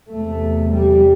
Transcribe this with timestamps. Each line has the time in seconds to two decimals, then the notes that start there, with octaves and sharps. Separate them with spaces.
0.12 E2 C3 A3
0.72 G3